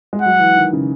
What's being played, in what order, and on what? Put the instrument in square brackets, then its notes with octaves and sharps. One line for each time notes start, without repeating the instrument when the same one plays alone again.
[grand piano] G#3
[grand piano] F#3 [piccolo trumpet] F#5
[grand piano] E3
D#3
C#3